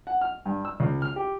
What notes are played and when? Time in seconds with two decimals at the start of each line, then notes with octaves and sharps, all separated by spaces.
0.07 F#5
0.21 F6
0.45 G2
0.65 E6
0.80 C#2
1.02 F6
1.16 G4